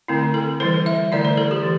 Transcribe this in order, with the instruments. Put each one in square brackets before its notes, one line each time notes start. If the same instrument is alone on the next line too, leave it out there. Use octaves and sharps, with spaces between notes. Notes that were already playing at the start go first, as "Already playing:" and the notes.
[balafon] D3 A3 C4 E4
A4
E3 G3 E4 C5
E5
D3 A3 E4 D5
C5
A4
G4
E3